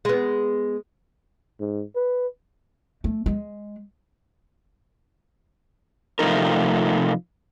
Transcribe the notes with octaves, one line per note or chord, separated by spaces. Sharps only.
G#3 B3
G#2
B4
A3
G#3
C3 F3 A3 D#4 A#4